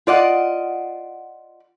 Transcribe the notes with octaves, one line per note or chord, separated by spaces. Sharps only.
F4 D5 D#5 F#5